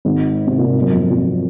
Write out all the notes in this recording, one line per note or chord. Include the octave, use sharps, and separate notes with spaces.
G#1 G#2
C3
A#2
G#2
F#2
F2
F2